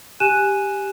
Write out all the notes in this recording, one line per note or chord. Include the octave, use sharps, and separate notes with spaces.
G4 G#5 F#6 D#7 E7